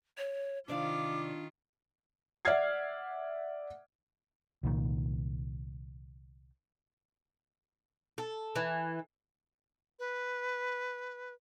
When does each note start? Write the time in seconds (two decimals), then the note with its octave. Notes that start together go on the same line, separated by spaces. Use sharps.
0.18 C#5
0.68 C3 D#3 D4 F4 D5 F5 D6
2.45 D5 E5 F#5 F6 G#6 C7
4.63 C2 A#2 D#3
8.18 A4
8.56 E3
9.99 B4